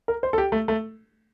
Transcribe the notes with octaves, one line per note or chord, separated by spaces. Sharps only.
A#4
C5
A4
G4
A3
A3